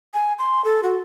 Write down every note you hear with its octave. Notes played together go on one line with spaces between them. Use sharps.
G#5
C6
A4
F#4